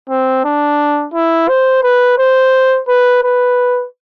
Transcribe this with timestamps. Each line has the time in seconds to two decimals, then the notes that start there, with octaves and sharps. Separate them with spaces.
0.09 C4
0.45 D4
1.14 E4
1.48 C5
1.83 B4
2.18 C5
2.88 B4
3.23 B4